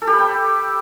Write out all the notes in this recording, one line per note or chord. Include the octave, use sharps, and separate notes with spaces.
A4
G4
B4
G5